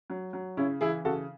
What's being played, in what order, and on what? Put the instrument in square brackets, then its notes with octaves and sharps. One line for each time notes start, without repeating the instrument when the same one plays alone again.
[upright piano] F#3
F#3
C#3 C#4 E4
E3 E4 G#4
C#3 F#4 A4